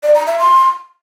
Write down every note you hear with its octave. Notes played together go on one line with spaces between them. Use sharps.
D5
A#5
E5
C6